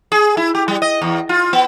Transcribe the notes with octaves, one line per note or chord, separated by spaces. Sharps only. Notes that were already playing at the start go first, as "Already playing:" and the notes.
G#4
E4
G4
G3
D#5
E2
F4
B3